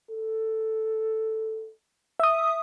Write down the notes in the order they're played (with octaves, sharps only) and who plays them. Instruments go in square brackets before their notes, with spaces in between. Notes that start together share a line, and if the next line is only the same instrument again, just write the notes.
[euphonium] A4
[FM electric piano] E5 D#6